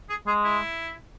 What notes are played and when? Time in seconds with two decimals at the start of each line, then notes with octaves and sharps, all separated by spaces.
0.09 G#4
0.27 G#3 G#4
0.45 E4